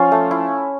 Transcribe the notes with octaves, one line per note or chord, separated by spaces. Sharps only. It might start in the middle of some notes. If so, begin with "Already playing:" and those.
Already playing: F3 C#4 F4 F5
A3
E4